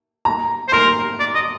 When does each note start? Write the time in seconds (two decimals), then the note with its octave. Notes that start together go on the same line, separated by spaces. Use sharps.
0.25 A#5
0.68 C5
0.72 A#4 C6
1.20 D5
1.35 D#5